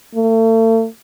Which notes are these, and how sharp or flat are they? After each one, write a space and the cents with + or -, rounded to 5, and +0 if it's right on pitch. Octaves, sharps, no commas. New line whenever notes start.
A3 +40